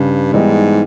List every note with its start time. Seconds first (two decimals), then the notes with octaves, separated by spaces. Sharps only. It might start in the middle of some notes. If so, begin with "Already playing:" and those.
Already playing: G2 C#3
0.33 G#2 E3 G3 B3 D#4